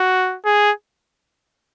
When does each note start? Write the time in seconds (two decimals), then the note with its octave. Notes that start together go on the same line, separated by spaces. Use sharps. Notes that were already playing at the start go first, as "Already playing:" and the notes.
Already playing: F#4
0.45 G#4